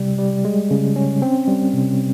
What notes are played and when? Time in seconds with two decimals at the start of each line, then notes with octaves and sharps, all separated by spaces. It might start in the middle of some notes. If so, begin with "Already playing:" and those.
Already playing: C3 G3
0.19 G3
0.45 G#3
0.71 C#3
0.96 C#4
1.22 C4
1.48 G3
1.73 C3